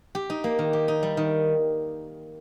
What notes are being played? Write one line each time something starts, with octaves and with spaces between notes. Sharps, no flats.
G4
D#4
A#3
D#3
G4
D#4
G3
D#3